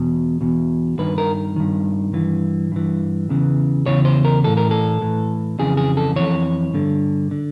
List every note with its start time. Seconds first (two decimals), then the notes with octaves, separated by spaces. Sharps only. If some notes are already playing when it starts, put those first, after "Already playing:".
Already playing: E2 B2
0.41 E2 B2
0.99 G2 D#3 B4
1.18 A#4
1.56 G2 D#3
2.13 G2 E3
2.72 G2 E3
3.29 E2 C#3 E3
3.86 E2 C#3 E3 C#5
4.05 C5
4.25 A#4
4.44 A2 E3 A4
4.57 A#4
4.71 A4
5.01 A2 E3
5.59 F2 C#3 E3 G#4
5.77 G#4
5.97 A4
6.16 F2 C#3 E3 C#5
6.74 G2 D3
7.31 D3